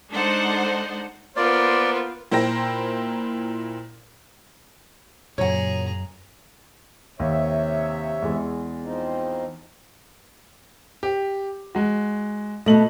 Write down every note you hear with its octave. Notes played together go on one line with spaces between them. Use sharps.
G#3 D4 D#4 A4 C5 F#5
A#3 B3 F4 A#4 C5 D5
A#2 E4 A#4 C5 G5 A#6
F#2 A#2 C#3 F#3 G#4 C#5 F#5 A#5
D#2 C3 C#5 E5
E2 G#3
F3 C4 D#4
G4
G#3 F#4
B2 A3 D#5 F#7